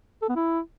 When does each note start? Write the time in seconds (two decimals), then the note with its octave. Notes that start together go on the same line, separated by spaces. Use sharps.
0.22 A4
0.29 B3
0.36 E4